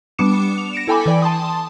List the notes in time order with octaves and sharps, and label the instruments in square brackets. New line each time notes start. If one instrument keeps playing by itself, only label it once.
[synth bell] G3 B3 D4 D6 C#7 E7
F7
A#6 C#7 D7 E7
E4 A4 G5 G#5 B5 D6
E3 D5 G5
A5 C6 D#6